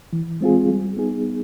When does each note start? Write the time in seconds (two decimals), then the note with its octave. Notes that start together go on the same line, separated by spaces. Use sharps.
0.13 E3
0.41 G#3 C4 F4 G#4
0.69 G3
0.97 B3 D#4 G#4